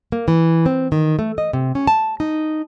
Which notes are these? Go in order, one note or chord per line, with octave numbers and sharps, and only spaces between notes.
A#3
E3
C4
D#3
A3
D#5
C3
C#4
A5
D#4